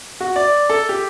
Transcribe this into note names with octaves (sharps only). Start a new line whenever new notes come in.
F#4
D5
A4
G4